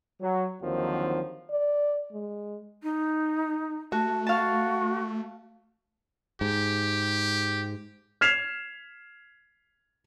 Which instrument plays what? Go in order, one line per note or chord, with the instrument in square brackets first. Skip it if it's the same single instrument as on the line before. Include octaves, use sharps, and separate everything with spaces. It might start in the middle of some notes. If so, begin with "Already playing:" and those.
[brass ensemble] F#3
D#2 D3 D#3 F3 F#3 C4
[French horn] D5
G#3
[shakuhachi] D#4
[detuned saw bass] A3 [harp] F#4 [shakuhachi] A5
[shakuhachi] F#4 [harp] F5 A5
[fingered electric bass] G#2 [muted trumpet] G4
[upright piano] F6 G#6 B6 C7 E7 F7